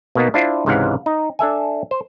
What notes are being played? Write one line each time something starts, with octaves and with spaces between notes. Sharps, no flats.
B2 A#3 B3 D#4
D4 E4 F4 C5
C#2 G#2 C3 E3 F5 F#5
D#4
D4 A4 E5 G#5
C5